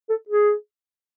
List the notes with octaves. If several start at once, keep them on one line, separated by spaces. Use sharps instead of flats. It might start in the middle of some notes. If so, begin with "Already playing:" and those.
A4
G#4